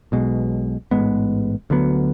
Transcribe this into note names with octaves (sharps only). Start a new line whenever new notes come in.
B1 B2 G#3
A1 G#2 G#3 B3
D2 D3 F#3 B3